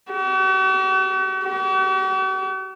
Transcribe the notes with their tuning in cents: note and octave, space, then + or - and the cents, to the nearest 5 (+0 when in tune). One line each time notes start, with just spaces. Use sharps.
F#4 +45
F#4 +45